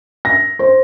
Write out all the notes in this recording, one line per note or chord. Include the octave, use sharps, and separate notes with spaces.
A#6
C5